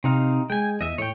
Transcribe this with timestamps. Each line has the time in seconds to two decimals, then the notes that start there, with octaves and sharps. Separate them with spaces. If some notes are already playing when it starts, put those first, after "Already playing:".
0.04 C3 C4 D#4 F5
0.50 G#3 G5 G#5
0.81 E2 D#5 E5
0.98 A2 C#5 G5